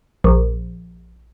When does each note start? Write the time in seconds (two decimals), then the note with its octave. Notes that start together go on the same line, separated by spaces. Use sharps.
0.24 A#1